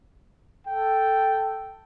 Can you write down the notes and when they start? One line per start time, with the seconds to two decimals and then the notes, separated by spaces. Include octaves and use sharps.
0.67 A4 G5